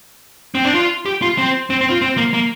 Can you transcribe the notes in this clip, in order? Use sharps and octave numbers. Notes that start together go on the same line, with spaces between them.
C4
D4
F4
G4
F4
C4
C4
C4
F4
C4
A#3
A#3